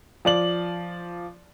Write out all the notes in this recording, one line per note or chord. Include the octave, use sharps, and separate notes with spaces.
F3 D5 F#7